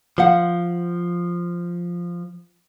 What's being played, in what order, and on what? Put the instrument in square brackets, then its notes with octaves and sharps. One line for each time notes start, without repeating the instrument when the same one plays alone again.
[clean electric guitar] F3 [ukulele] C5 F5 F#5